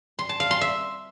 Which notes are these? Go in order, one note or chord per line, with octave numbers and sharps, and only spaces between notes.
C6
A5
F5
C6
E5